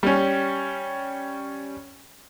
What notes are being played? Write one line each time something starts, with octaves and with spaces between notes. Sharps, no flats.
G3 C#4